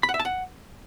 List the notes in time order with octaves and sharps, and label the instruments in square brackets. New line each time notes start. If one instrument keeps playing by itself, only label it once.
[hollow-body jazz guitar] B5
F#5
E5
A5
F#5